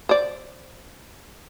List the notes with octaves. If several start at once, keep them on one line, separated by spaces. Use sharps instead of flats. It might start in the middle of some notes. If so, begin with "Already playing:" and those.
C5 D5